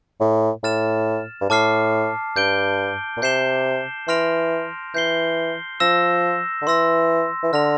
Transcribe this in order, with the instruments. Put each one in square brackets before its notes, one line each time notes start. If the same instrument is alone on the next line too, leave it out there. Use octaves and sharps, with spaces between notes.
[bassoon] A2
[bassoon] A2 [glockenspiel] F6 A6 E7
[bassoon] G2
[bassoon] A2 [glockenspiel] A5 D6 F6 C7
[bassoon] G2 [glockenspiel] G6 D7 G7
[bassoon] A#2
[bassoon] C3 [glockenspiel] G6 C7 E7 G7
[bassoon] E3 [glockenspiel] C6 F6 A#6 D7 F7
[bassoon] E3 [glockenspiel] G6 C7 G7
[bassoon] F3 [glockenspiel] E6 A#6 E7
[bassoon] D3
[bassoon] E3 [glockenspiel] C6 E6 A#6
[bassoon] E3
[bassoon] D3 [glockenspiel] F6 A#6 F7